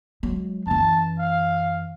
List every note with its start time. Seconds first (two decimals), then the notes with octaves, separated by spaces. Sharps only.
0.23 F#3 G#3
0.67 F#2 E3 A5
1.19 F5